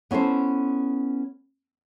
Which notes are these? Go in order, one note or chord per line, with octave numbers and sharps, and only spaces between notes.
B3 C#4 E4 A4 C5